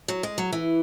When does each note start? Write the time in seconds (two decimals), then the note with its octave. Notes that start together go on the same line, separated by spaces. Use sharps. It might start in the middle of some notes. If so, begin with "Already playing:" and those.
0.08 F#3
0.23 G#3
0.38 F#3
0.53 E3